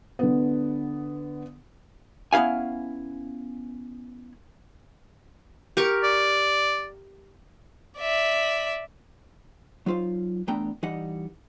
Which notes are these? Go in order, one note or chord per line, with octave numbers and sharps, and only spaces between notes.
D3 B3
B3 C#4 E4 F5 G#5
G4 A#4 C#6
D5
D5 E5
F#3 D#4 F4 C5 F5
E2 A3 B3 D4 G5 A#5
E3 G3 D#4 D#5 F#5